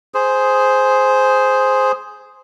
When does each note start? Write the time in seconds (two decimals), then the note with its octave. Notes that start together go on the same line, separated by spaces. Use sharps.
0.14 G#4 C5